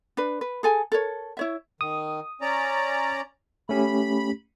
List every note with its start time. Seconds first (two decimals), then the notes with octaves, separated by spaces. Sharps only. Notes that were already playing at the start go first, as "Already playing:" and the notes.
0.17 D4 B4
0.41 B4
0.63 G#4 A4 G#5
0.92 A4 A#4 C#5
1.37 E4 C#5 E5
1.81 D#3 D#6
2.41 C#4 D5 A#5
3.69 A3 C#4 G4 B5